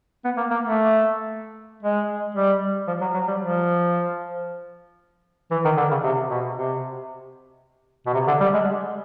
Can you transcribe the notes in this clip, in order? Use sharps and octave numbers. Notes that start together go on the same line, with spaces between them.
B3
A#3
A#3
A3
G#3
G3
F3
F#3
F#3
G3
F3
E3
D#3
D3
C#3
C3
B2
C3
B2
C3
D3
G3
G#3